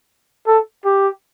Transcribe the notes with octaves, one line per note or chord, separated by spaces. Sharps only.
A4
G4